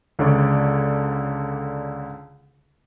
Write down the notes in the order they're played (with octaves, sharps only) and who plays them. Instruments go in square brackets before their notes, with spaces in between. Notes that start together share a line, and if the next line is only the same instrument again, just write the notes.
[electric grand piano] C#2 D3 C#5 D5 C#6